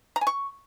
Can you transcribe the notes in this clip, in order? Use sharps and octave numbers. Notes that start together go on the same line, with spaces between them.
A#5
G#5
C#6